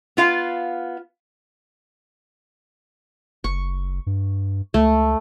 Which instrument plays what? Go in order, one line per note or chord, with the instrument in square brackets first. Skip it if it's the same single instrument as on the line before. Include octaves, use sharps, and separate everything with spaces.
[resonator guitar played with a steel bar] B3 F4 F5
[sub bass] F#1 [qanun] C#6
[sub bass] G2
[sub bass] C#2 [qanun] A3